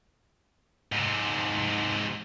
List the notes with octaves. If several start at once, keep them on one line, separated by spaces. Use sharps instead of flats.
G#2 C3